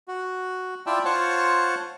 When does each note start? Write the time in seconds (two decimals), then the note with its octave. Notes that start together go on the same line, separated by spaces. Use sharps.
0.08 F#4
0.86 E4 F4 D5 E5 G5 A5
1.05 F4 C5 C#5 F#5 A5 C#6